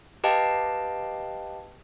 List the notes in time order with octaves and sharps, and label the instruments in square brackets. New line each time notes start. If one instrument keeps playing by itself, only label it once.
[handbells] G4 B4 D#5 F5 G5 A5